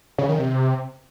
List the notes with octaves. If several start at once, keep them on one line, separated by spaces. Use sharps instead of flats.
C#3
D#3
C3